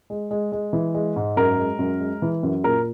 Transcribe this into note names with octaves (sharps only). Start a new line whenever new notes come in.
G#3
G#3
G#3
E3
G#3
G#2
F#2 A#4
G#3
F#2
G#3
E3
F#2
A#2 A#4